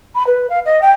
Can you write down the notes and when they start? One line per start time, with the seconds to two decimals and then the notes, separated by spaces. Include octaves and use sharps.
0.15 B5
0.27 B4
0.50 F5
0.65 D#5
0.82 G5